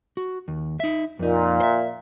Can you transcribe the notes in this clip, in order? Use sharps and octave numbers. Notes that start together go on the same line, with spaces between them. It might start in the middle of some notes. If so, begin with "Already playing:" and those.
F#4
D#2
D#4 E5
F2 A#2 D#4
C5 E5